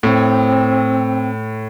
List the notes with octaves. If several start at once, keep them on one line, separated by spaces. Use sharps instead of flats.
A2 C4